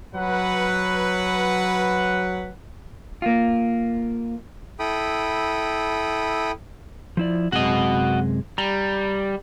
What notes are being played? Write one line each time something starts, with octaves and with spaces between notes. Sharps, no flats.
F#3 B4 F#5
A#3 F4
E4 A4 G5 B5 D#6
F3 E4 D5
F#2 C3 G#3 F#4 D#5
G3 A#5